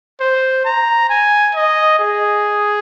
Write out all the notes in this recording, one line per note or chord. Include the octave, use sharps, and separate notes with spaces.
C5
A#5
G#5
D#5
G#4